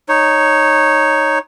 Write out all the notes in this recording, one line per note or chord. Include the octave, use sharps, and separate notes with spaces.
D#4 C#5